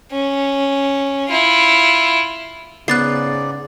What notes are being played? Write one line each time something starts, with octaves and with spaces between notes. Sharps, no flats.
C#4
E4 F4
G#2 C#3 B3 D5 F#6 A6 C7